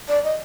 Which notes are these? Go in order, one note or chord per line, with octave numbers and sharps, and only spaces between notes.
D5
D#5